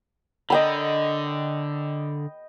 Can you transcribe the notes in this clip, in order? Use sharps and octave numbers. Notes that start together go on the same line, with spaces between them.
D3 D#5 G5 B5